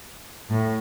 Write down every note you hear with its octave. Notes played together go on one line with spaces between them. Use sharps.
A2